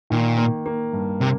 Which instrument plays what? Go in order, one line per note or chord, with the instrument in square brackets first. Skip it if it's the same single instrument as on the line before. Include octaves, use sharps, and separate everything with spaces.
[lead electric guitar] A#2 [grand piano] D#3
[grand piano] A#3
A#3
G2
[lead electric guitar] C3 [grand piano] A#3